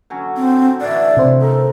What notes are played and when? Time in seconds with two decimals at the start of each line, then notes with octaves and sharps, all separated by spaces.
0.10 D3 F#3 C#4
0.37 C4
0.81 A2 D3 E3 D5
1.17 C3 C5
1.41 D#4 A4 A#4